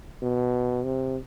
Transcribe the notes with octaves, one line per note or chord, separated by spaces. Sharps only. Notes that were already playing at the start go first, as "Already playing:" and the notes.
B2
C3